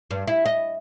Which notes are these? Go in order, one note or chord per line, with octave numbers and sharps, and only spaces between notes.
G2
E4
D#5